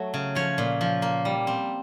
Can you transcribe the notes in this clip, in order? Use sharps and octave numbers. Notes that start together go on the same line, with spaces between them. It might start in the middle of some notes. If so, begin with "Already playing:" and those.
Already playing: F#3 A3
C#3
F3 C#5
A#2
F3
A#3
G3
C4